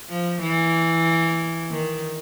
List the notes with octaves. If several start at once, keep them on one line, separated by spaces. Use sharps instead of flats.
F3
E3
D#3